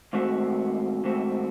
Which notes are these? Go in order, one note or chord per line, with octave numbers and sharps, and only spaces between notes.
G#2 D#3 A3 C4 F#4
G#2 D#3 A3 C4 F#4